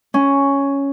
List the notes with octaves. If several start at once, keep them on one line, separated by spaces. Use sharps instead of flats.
C#4